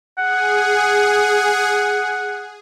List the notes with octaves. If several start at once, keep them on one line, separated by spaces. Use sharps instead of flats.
G#4 F#5